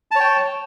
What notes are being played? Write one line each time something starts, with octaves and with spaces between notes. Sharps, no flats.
C#5 G5 A5